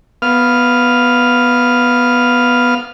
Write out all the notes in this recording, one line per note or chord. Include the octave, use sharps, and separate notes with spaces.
B3 F5 F6